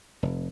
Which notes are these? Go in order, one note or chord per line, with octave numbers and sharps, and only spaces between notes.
F1